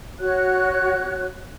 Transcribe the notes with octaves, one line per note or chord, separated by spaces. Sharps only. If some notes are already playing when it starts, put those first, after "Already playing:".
F#4 C#5 F#6